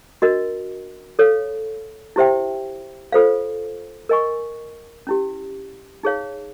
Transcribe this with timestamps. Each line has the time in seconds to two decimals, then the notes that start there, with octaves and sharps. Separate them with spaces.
0.22 D4 F#4 A#4 D#5
1.19 A4 C#5 F5
2.16 E4 G4 C5 E5 G5
3.12 F4 A4 C5 F5
4.09 A#4 D#5 G#5 C#6
5.07 C#4 E4 G4
6.03 D#4 G#4 C#5 F5